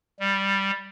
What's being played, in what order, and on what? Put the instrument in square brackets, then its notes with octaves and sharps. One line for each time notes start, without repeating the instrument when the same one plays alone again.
[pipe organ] G3